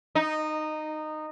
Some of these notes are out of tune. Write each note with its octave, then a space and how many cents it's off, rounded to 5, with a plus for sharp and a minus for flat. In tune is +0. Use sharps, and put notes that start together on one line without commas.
D#4 -15